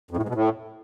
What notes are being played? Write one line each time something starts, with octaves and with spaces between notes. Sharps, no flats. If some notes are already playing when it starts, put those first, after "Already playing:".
F2
A2
G#2
B2
A2